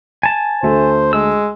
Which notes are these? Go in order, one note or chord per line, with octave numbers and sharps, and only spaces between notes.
G#5 A5
D2 A3 C5
G#3 E6